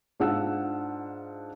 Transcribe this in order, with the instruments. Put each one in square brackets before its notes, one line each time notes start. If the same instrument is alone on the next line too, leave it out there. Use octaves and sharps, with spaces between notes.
[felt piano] G#2 D4 F4 F#5 E6